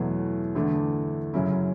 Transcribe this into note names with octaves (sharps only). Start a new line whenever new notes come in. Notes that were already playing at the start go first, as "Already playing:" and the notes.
Already playing: E2 B2 F#3 A3
E2 D3 A3 D4
F#2 C#3 F#3 C#4 E4